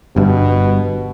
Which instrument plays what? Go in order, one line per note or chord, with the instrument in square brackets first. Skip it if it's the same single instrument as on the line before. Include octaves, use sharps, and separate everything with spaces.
[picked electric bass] G1 G2 [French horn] B2